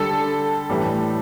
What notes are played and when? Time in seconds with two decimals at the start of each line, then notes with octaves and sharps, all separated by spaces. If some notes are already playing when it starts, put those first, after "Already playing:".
Already playing: D3 G3 A4
0.70 A2 E3 G3